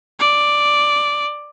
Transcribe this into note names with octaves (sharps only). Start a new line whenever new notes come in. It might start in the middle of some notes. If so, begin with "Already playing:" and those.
D5